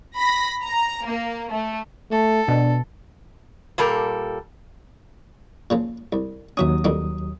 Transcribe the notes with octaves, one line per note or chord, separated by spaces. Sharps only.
B5 A#6 B6
A#5
A#3
A3
A3 A4
B2 D4
A#2 G3 A4 A#4
A#2 C#3 F3
C2
D#2 F#3 C#4 F#4 E5 D#6
F2 D#3 G3